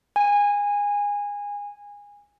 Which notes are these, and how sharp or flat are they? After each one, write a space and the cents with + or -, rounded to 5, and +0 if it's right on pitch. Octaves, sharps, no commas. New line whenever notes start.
G#5 -20